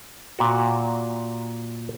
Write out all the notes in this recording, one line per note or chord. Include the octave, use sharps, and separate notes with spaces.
A#2 F#4